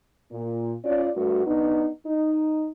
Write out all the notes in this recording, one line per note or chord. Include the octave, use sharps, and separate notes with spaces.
A#2
C#4 F4 D5
G2 A3 F#4
B3 D4 D#4
D#4